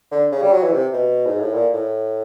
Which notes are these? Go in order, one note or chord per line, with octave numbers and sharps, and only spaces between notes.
D3
C#3
G3
F#3
E3
C3
B2
G#2
A2
A#2
A2